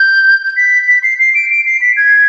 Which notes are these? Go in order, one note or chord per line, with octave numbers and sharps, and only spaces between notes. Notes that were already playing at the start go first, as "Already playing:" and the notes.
Already playing: G6
B6
B6
C7
C7
D7
D7
C7
B6
G#6